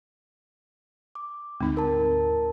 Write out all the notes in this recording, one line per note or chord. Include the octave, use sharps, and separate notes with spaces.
D6
D2 G#2 C4 D#4
A#4 A5